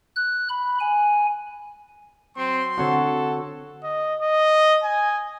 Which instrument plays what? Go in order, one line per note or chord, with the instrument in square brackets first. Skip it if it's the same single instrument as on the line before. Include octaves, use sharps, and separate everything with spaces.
[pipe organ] F#6
B5
G#5
[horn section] F#3 C6 [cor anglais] C4
[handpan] D3 C4 F#4 [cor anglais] A4 [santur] C#5 F#5
[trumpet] D#5
D#5
G#5